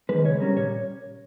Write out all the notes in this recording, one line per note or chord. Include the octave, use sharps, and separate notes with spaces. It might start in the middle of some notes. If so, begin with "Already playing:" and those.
D#3 G#3 B4
C#3 C#5
G3 C#4 A#4
A#2 C#5